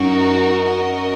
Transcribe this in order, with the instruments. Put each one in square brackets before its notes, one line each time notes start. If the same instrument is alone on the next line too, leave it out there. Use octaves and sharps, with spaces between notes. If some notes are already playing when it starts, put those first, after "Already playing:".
Already playing: [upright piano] F#2 [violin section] D#4 F#4 A#4
[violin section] F#4 A#4 D#5